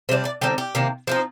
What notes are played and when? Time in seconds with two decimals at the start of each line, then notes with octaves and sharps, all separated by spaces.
0.09 C3 C5
0.11 G3 D4
0.25 D5
0.41 D3 G3 C4 D#4 G4
0.58 G4
0.75 C3 D#3 A#3
1.07 F3 C4 D#4